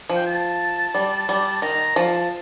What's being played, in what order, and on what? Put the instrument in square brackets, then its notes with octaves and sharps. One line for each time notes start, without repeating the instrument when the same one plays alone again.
[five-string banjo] F3
[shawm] G5
A5
[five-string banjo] G3
G3
[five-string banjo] D#3 [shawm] A#5
[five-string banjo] F3 [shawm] A5